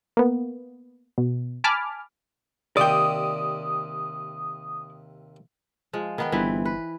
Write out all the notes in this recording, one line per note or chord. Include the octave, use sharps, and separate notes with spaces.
A#3 B3
B2
G#5 A5 B5 D6 F6
D#2 C3 D5 G5 D#6
F3 G#3
D#3 B3 G5
G1 E3 C4 B4
B4